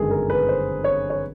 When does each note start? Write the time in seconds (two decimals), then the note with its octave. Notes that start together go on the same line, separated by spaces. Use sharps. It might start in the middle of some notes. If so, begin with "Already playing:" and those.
Already playing: G1 F#2 D#3 G#3 G#4 A4
0.11 A#4
0.30 B4
0.49 C5
0.84 C#5
1.10 C#5